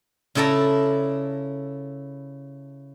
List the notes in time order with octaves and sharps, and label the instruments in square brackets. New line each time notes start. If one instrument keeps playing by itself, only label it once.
[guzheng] C#3 E4 A4 D5 A#5